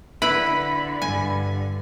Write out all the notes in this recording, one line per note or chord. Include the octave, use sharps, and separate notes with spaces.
D3 E4 B4 B5
G2 G#5